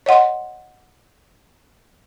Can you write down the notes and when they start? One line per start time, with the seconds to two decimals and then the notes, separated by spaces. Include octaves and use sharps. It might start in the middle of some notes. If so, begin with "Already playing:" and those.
0.06 C#5 D#5 F#5 C6